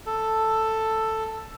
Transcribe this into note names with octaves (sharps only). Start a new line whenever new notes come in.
A4